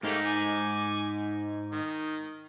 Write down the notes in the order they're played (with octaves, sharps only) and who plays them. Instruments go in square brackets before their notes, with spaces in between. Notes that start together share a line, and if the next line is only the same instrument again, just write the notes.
[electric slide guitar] G#2 D#4 [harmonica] A3 A#3 G4
[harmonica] G#5 D6
D#3